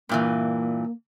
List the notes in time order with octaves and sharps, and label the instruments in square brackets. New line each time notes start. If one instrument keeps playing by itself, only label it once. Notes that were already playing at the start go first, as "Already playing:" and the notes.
[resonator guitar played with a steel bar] G2 A#2 E3 [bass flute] A#3